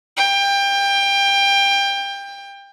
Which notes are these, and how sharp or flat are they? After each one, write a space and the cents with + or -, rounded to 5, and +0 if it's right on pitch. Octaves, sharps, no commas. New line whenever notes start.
G5 +25